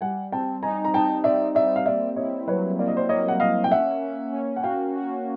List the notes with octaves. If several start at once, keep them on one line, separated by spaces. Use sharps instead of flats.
G3 F#5 G#5
C4 G5 A5
D#4 G#5 A#5
A#5
D#4 G5 A5
C4 D5 E5
G3 D5 E5
F5
A#3 D5 E5
E4 C#5 D#5
F#3 B4 C#5
A#3 D5
D#5
C5 D5
A#3 C#5 D#5
F#5
A#3 D#5 F5
G5
C#4 E5 F#5
C#4
C#4
F#5
F#4 F5 G5
F#4